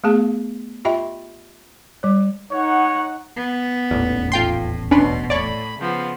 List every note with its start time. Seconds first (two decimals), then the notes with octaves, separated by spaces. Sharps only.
0.04 A3 B3 G#4 A5
0.85 F4 G4 D#5 E5 G5 B5
2.03 G3 C#5
2.51 D#4 C#5 F#5
3.36 B3
3.91 D#1 A1 E2
4.32 A2 F4 G5 C6
4.91 B2 C#4 D4 B4 C6
5.30 A2 C#5 D5 B5
5.79 C#3 F3 B3